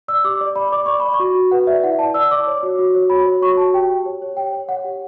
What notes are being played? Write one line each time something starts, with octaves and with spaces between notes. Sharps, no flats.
D5 E6
G4 D6
D5
D5 B5
D5 D6
D5 C#6
D5 B5
C#6
F#4
F#4
B4 F#5
D5 E5
E4 F#5
D5 A5
D5 E6
D5 D6
C#5
F#4
F#4
C#5
F#4 B5
C#5
F#4 C#6
F#4 A5
G4 G5
G4
C#5
C#5
G4 G5
C#5
C#5 F#5
G4